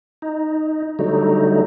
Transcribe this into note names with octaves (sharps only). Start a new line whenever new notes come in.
D#4
D3 F#3 G3 A3 D#4